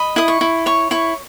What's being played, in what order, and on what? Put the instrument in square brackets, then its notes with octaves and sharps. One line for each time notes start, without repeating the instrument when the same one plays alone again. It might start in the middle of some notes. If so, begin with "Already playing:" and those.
Already playing: [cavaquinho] D#5 B5
E4 D#6
C#6
E4
C#5 C#6
E4 C#6